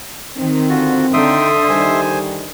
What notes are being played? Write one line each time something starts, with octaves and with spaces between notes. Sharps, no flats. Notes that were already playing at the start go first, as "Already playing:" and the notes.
D#3 C4
D3 F4 F#4
D3 D#4 E5 G5 C6 D#6
D#3 G3 D#4 C5 G#5